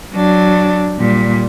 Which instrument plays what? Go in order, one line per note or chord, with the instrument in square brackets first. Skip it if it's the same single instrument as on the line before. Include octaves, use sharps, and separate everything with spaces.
[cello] F#3 D4
A#2 G3